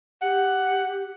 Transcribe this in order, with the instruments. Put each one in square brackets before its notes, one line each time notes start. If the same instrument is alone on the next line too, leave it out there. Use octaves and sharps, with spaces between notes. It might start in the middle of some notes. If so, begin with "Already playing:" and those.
[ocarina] G4 [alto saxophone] F#5